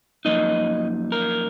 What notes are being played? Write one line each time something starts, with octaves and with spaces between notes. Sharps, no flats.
F#2 F3 A#3 D#4 D#5
A#4